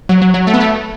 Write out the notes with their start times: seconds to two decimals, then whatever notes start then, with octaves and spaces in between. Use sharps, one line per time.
0.09 F#3
0.22 F#3
0.34 F#3
0.47 A3
0.53 B3
0.60 A3